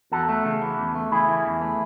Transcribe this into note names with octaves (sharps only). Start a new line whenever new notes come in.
E2 F#4 A4
A3
C#3
E3
E2
A3
C#3 E4 G#4
E3
E2
A3